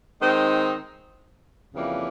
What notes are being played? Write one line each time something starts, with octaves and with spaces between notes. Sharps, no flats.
D#3 G#3 C4 D#4
F2 C#3 E3 G3 A#3